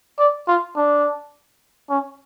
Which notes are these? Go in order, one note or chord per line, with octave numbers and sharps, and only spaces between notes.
D5
F4
D4
C#4